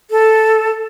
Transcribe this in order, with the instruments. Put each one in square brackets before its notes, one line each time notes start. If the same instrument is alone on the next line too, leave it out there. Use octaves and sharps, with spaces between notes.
[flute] A4